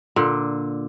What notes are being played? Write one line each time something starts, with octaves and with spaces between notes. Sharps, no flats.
A#2 D3